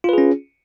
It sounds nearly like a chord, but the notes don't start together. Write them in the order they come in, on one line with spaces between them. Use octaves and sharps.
F4 B4 G#4 C#4